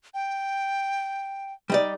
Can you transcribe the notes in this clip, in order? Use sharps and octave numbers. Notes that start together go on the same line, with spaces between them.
G5
G3 D#4 D5